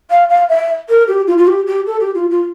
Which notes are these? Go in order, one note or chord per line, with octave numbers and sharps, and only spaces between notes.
F5
F5
E5
A#4
G4
F4
F4
G4
G4
A4
G4
F4
F4